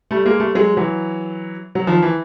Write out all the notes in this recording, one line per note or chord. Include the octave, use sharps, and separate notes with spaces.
G3 A3
G#3 A#3
G3 A3
F#3 G#3
E3 F#3
F#3
D#3 F3
E3